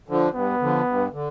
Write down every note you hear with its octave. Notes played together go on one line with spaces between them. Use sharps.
D3 F3
G2 B3
D3 F3
G2
D3